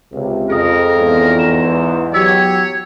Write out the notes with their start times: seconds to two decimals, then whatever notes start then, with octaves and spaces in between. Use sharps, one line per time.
0.12 C#2 C3
0.50 F2 G#4 A#4 D#5 D#6
0.96 E2 G#2
1.39 E7
2.14 F#3 G4 C#5 E6 B6